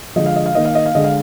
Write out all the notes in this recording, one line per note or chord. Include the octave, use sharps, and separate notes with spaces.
D3 F3 G#3 D#5
F5
D#5
F5
D#3 A#3 D#5
F5
D#5
F5
D3 G#3 D#5
F5